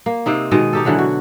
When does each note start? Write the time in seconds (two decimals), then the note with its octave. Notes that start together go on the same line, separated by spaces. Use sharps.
0.06 A#3
0.26 C3 C4 D#4
0.51 B2 D#3 G#3 D#5
0.73 D#4 G4 A4
0.85 D3 E3 F#3 G#3
0.98 F#4